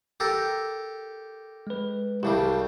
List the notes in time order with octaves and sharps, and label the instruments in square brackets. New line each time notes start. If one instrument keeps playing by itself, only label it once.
[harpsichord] G4 A4 A#4
[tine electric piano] G#3 B4
[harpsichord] C2 C#3 G3 [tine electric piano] G4 A5